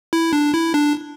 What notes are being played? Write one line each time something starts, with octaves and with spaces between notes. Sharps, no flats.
E4
D4
E4
D4